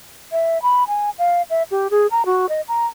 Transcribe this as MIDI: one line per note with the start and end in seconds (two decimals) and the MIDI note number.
0.32 0.61 76
0.62 0.84 83
0.88 1.10 80
1.19 1.42 77
1.50 1.63 76
1.71 1.90 67
1.91 2.07 68
2.11 2.25 82
2.26 2.49 66
2.49 2.61 75
2.68 2.86 82